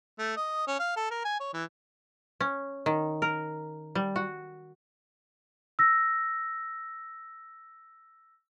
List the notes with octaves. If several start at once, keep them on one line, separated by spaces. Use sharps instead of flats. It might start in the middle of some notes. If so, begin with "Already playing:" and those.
A3
D#5
C#4
F5
A4
A#4
G#5
C#5
E3
C#4
D#3
A#4
G3
F#4
E6 A#6